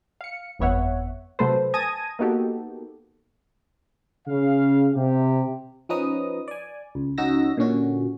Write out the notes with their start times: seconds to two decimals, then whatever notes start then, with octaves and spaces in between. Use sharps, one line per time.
0.21 F5 C#7
0.59 G1 F2 B3 C#5 E5 F#5
1.39 C3 F#3 A3 A4 B4 C5
1.74 G#5 A5 D#6 G#6 A#6 D#7
2.19 A#3 B3 D#4 F#4 G4 A4
4.27 C#3 F5
4.94 C3 G4
5.89 F3 C#4 D#4 B4 A#5 D#6
6.48 D5 G#5
6.95 C#2
7.18 C#2 C#4 D#4 F#4 E6 A#6
7.57 A#2 D3 C#4 F#4